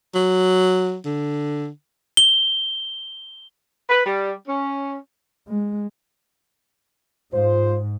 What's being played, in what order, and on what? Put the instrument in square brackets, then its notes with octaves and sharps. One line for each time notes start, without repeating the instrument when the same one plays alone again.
[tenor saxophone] F#3
D3
[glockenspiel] G7
[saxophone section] B4
G3
C#4
[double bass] G#3
[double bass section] G#2 [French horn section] F4 C5